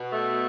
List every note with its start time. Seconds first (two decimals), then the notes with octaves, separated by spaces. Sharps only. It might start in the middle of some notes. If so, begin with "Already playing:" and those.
Already playing: B2
0.12 A3